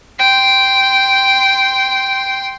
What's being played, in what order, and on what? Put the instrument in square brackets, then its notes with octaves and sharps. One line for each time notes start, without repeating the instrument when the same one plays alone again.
[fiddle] G5 C6